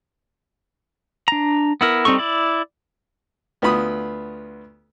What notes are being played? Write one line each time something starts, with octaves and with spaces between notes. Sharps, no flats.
D4 A#5
B3 E4 A#4
G3 C4 D#4 A4 C#6
E4 D5
D2 B3 F4 B5 D#6